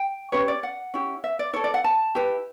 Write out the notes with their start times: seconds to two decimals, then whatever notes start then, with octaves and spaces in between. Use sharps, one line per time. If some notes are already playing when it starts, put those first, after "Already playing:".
Already playing: G5
0.32 C#4 G4 B4 C#5
0.48 D5
0.63 F#5
0.94 C#4 E4 G4
1.24 E5
1.39 D5
1.53 E4 A4 C#5
1.64 D5
1.74 F#5
1.84 A5
2.15 E4 G4 B4